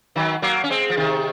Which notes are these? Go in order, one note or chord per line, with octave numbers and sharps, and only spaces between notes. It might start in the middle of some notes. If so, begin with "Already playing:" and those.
D#3 F#3
F#3 A#3
C#4
G#3 C4
F3
C3 D#3